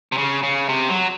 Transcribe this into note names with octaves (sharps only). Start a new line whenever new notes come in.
C3
C#3
C#3
C3
F#3